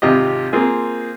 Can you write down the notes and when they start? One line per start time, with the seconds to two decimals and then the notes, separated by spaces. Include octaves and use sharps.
0.02 G#1 C3 F4 G4 D#5
0.53 A#3 C4 F4 G#4